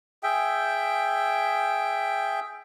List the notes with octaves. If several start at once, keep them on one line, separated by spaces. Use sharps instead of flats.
G#4 E5 G5